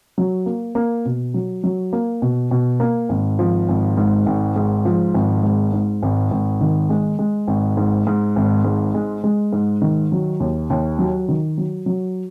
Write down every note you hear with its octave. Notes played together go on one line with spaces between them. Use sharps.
F#3
A#3
A#3
B2
F#3
F#3
A#3
B2
B2
A#3
G#1
F3
G#1
G#2
G#1
G#2
F3
G#1
G#2
G#2
G#1
G#1
D#3
G#3
G#3
G#1
G#2
G#2
G#1
G#2
G#3
G#3
G#2
D#3
F#3
D#2
D#2
F#3
D#3
F#3
F#3